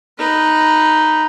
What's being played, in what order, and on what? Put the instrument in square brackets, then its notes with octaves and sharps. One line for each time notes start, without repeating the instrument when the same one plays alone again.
[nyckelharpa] D#4 B4